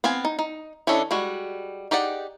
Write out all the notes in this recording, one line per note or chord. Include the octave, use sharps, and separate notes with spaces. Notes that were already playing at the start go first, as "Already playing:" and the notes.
B3 C4 F5 G#5
D#4
D#4
E3 C#4 D4 A4 D#5
G3 G#3 F#4
D#4 G4 G#4 D5 F#5